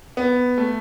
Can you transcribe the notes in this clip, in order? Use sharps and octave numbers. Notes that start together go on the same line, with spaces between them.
B3
A3